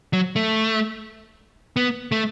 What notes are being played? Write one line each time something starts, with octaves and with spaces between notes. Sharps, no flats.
F#3
A3
B3
A3